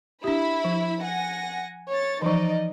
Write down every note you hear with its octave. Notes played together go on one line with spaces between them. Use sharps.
D4 E4 G4 B5
F3
F#5 G#5 A#6
C#5 A6
E3 F3 D#4 D5 D#5